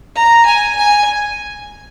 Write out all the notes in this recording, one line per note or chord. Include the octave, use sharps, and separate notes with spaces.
A#5
G#5
G#5